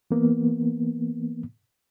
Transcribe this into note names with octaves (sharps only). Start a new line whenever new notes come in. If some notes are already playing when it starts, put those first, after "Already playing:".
E3 A#3 B3